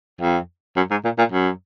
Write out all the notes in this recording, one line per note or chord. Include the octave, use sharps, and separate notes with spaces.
F2
F#2
G#2
A#2
A#2
F#2